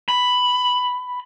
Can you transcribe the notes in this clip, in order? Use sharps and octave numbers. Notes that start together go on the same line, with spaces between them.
B5